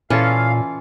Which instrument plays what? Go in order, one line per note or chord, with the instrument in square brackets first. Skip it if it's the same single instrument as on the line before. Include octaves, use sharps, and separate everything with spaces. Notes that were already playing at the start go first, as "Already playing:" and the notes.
[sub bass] A#2 [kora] E3 F4 A4 [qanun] C#4 [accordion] F5